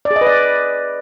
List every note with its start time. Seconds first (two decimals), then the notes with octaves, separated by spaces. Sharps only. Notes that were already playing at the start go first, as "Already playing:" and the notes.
0.05 D5
0.11 G#4
0.16 D#5
0.21 B4
0.27 D5